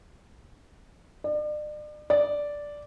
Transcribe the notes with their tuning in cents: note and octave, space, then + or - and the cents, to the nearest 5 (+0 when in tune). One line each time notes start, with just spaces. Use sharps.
D5 +40
D5 -5